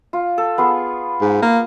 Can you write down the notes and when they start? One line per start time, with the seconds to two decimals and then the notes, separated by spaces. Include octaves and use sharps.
0.13 F4
0.38 A4
0.58 B3 F4 G#4
1.21 G#2
1.42 A#3